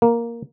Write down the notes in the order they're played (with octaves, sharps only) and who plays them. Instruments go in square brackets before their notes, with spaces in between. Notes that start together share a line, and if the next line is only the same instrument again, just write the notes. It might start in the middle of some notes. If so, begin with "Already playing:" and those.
[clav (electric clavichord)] A#3